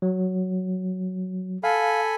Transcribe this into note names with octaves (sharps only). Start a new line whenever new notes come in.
F#3
A4 F5 G#5 B5